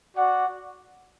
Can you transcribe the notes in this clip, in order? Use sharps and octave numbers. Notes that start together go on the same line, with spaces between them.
F#4 D5 F#5